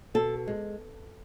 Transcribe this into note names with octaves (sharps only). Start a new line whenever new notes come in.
B2 A4
G#3